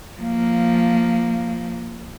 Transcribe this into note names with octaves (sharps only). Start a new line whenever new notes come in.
F3 A#3